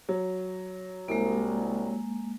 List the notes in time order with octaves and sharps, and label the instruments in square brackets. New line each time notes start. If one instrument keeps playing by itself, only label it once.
[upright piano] F#3
[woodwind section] C2 [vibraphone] G#3 A#3